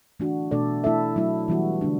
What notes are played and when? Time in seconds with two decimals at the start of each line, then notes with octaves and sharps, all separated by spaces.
0.20 E3 A3 D4 F#4
0.51 B2 A3 D4 A4 D5
0.84 A3 E4 A4 E5
1.16 F#3 A3 E4
1.48 E3 G3 B3 F#4
1.81 D3 A3 D4